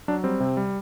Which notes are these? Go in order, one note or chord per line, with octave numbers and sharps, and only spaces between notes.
F#3 D4
G3 C4
C3
G3